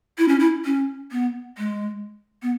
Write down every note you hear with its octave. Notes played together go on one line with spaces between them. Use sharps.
E4
C#4
E4
C#4
B3
G#3
B3